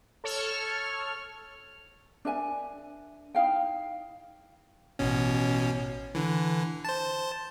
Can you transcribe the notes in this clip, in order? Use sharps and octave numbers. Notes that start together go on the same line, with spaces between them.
A4 C#5 C#6 F6
D4 A#4 E5 G#5
D#4 E4 F5 G5
A1 B2 C#4
D3 E3
C5 A5